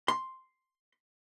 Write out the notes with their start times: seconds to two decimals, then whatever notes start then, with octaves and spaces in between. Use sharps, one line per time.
0.08 C6